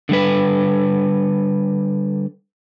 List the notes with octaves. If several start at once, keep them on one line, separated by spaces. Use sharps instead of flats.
D3 G3 B4